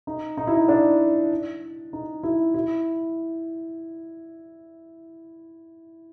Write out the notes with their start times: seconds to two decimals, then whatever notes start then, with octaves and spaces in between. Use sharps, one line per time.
0.07 D#4
0.37 D#4
0.47 E4
0.55 D#4
0.68 D4
1.93 D#4
2.23 E4
2.54 E4